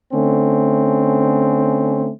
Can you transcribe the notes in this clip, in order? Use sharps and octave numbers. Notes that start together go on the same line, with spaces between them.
D3 A3 C4 C#4